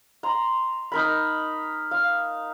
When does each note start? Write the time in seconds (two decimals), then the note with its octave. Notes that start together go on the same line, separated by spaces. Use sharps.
0.23 A#5 C6
0.92 D#4 A#4 B5
1.91 F5